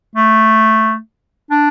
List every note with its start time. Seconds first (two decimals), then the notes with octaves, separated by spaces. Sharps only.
0.15 A3
1.51 D4